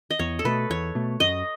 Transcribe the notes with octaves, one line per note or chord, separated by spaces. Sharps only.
D#5
E2 C#5
A4
B2 A3 B4
E2 C#5
B2 A3
F#2 D#5